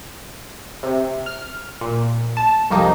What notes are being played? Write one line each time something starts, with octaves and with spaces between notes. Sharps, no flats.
C3
F6
A#2
A5
C2 F2 A#3 D#4